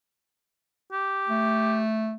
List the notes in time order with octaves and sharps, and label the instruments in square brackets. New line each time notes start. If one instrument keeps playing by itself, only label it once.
[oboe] G4
[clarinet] A3